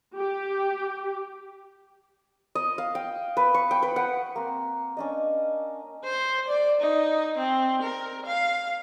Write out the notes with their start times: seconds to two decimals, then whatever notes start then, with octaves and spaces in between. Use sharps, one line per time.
0.17 G4
2.55 D#5
2.78 F5
2.95 G5
3.37 B4
3.54 C#6
3.71 G5
3.83 B4
3.96 F#5
4.36 A#3 C4
4.97 C#4 D4 D#5
6.04 C5
6.48 D5
6.81 D#4
7.38 C4
7.82 A#4
8.26 F5